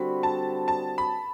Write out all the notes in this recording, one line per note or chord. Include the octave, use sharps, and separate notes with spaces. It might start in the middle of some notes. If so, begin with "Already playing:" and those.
Already playing: D3 G3 C4 F#4 B5
A5
A5
B5